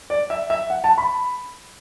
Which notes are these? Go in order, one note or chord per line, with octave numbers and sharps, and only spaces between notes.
D5
E5
E5
F#5
A5
B5